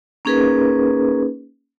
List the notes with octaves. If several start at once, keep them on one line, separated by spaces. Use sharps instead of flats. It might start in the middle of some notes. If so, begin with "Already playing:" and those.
A#3 C#4 D#4 G#4 A#4 B4